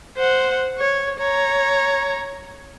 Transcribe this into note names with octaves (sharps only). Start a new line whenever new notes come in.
C5 F#5
C#5
C#5 A#5